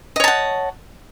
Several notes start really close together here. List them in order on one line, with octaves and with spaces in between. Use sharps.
D#5 C#5 A5 F#5